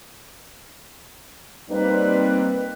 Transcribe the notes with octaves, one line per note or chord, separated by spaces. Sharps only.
G3 A#3 C4 D#4 B4